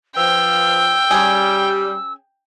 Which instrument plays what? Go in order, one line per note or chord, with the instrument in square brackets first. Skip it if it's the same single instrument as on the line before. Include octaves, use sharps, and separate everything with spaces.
[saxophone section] F3 B4 [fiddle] G5 [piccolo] E6
[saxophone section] G3 [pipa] C#4 G#4